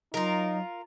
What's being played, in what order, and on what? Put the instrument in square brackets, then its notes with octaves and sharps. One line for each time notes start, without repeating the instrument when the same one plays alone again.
[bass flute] F#3 [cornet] D#4 [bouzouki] F4 A#4